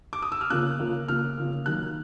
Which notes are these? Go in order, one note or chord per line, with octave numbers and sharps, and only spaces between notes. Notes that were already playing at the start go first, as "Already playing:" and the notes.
D6
D#6
E6
F6
C#3 F3 A#3 F#6
C#3 F3 A#3
C#3 F3 A#3 F6
C#3 F3 A#3
D#3 F#3 A#3 F#6